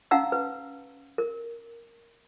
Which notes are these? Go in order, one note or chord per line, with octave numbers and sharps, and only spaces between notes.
C#4 D#4 F5 F#5 A#5 E6
B4
A#4